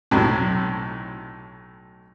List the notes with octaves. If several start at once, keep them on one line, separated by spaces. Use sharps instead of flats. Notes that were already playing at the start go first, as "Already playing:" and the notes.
B1 A2 C3 F#3